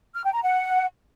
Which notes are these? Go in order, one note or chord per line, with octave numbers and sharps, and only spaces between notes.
F6
G5
A#5
F#5